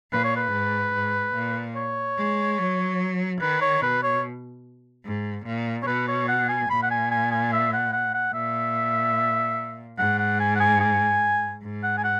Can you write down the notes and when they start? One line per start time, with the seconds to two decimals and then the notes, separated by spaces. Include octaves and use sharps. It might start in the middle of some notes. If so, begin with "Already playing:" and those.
0.12 A#2 B4
0.24 C#5
0.36 B4
0.52 G#2
0.94 G#2
1.35 A#2
1.76 C#5
2.18 G#3
2.58 F#3
3.41 D#3 B4
3.61 C#5
3.82 B2 B4
4.03 C#5
5.05 G#2
5.46 A#2
5.83 C#5
5.87 B2 B4
6.08 C#5
6.28 F#5
6.49 G#5
6.70 A#2 B5
6.83 F#5
6.91 G#5
7.11 G#5
7.31 G#5
7.53 E5
7.73 F#5
7.93 F#5
8.14 F#5
8.34 A#2 E5
9.98 G#2 F#5
10.19 F#5
10.40 G#5
10.55 F#5
10.60 G#5
10.80 G#5
11.63 G#2
11.83 F#5
11.98 G#5
12.04 F#5